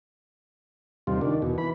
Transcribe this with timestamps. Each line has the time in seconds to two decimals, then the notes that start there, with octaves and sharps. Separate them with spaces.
1.07 D#2 C3 G3 F4
1.21 D#3 D4
1.42 E2 B2
1.58 E3 B5